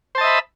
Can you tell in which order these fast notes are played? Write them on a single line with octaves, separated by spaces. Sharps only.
C5 A5 D#5 E5 B5